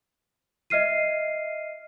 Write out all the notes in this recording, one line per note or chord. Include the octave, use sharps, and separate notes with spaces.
D#5 E5 F6 C7 D#7